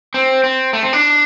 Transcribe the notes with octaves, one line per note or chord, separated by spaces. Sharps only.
C4
C4
A3
C4
D4